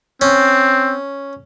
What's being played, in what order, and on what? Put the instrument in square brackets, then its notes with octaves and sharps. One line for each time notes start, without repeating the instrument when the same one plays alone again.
[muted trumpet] C4 [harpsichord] C#4